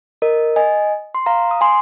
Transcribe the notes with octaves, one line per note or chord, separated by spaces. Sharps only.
A#4 D#5
D#5 G#5
C6
F5 A#5
D#6
G#5 C6